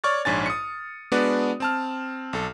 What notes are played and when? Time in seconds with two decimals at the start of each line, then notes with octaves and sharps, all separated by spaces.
0.04 C#5 D5 C#6 F6 A6
0.25 A#1 G#2 D4 C#5 G#5 A6
0.46 D#6 C#7
1.12 G#3 B3 D4 F#4 B4 D5
1.60 C4 A5 F6
2.33 B1 A4